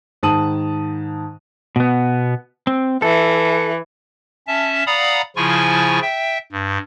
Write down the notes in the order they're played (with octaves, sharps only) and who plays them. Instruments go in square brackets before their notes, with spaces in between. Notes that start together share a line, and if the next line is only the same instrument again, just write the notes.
[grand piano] G#2 D#3 A5 D#6 D#7 F#7
[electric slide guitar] B2 B3
C4
[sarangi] E3 [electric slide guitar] A4
[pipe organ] C#4 E5 A5
D5 F5 F#5 A#5 B5 D#6
C#3 F3 E4 F4 G#5 C#6
E5 G5
G2